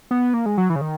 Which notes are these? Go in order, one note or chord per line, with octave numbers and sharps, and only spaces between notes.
B3
A#3
G#3
F#3
E3
C#3
D#3